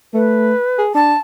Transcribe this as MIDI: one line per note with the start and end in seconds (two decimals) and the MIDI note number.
0.14 0.54 57
0.14 0.82 71
0.78 0.94 68
0.95 1.15 62
0.95 1.17 81